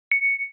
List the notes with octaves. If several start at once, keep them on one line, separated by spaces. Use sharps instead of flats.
C#7